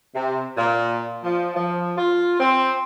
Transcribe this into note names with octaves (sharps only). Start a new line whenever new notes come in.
C3
A#2
F3
F3
F4
C4